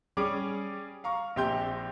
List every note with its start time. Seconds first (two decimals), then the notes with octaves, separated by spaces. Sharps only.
0.17 G3 C#4 G#4 D6 D7
1.04 F5 A#5 C#6
1.36 A#1 C4 G4 C6 G6